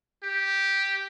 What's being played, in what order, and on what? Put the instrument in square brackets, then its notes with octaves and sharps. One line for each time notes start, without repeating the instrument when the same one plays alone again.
[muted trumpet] G4